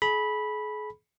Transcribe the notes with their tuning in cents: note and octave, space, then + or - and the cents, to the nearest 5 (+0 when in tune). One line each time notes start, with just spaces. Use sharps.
G#4 +40 B5 -10